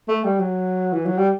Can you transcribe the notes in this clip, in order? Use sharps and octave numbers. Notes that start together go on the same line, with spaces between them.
A3
G3
F#3
E3
F#3
G3